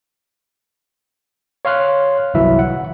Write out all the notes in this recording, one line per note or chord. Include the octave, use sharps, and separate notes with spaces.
C#5 F5 C6 F6 F#6
G1 C2 E3 F#3 E4 E5
F#5